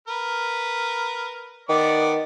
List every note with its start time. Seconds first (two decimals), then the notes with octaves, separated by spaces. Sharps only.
0.08 A#4 B4
1.69 D#3 B3 D5 D6